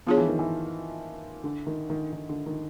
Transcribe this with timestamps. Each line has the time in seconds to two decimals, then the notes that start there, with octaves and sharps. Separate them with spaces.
0.07 F3 B3 D4 F4 G#4 C#5
0.17 E3
0.28 D#3
0.39 E3
1.44 D3
1.66 D#3
1.90 D#3
2.13 D#3
2.29 D3
2.46 D#3